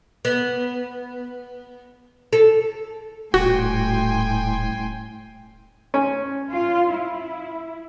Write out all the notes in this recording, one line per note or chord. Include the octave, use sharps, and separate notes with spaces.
B3
A4
D#1 A2 F#4 G5 G#5 C6
C#4
F4
E4